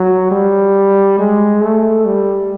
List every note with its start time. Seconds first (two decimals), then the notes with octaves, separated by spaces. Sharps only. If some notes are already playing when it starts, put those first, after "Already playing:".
Already playing: F#3
0.32 G3
1.19 G#3
1.62 A3
2.05 G3